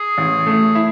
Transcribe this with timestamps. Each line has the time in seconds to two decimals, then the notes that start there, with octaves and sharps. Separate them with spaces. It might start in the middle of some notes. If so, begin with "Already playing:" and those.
Already playing: G#4
0.18 A1
0.46 A3
0.75 E4